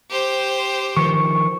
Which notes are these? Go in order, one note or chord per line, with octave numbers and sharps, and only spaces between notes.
G4 C5
D#3 F3 C#6